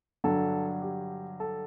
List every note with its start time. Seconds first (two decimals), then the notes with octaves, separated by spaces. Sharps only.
0.24 G2 D3 F#3 A4
0.82 G4
1.40 A4